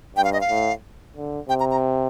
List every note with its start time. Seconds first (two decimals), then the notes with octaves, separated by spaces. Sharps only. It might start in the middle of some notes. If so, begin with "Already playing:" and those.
0.16 G2 G5
0.24 F5
0.33 D#5
0.41 F5
0.49 A2
1.16 D3
1.49 C3 G5
1.60 A#5
1.71 A#5